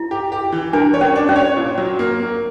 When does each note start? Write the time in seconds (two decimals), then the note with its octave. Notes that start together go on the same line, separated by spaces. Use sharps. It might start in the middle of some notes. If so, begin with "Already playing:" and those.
Already playing: E4
0.11 G4
0.32 G4
0.52 E3
0.73 D4 A#4
0.94 C#5
1.01 C#4
1.16 D4
1.29 C#4
1.36 C#5
1.57 A#2
1.78 F#3
1.99 A#3
2.20 A#3